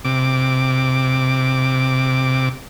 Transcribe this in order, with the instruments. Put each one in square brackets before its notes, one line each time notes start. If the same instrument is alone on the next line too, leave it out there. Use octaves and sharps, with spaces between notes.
[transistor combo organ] C3 D6